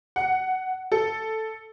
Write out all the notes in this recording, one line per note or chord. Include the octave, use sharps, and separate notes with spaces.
F#5
A4